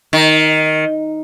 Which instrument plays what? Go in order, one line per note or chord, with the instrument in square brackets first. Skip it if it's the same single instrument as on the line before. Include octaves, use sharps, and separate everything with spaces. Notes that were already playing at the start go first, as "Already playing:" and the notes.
[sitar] D#3